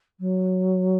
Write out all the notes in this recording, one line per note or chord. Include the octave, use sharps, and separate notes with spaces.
F#3